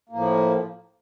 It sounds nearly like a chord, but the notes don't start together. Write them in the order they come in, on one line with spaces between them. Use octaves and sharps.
A#3 A2 F3